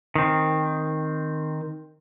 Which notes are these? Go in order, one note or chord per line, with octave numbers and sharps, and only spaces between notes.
D#3 C4